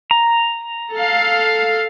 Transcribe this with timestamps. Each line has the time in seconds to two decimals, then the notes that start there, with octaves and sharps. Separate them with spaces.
0.11 A#5
0.93 A4 F5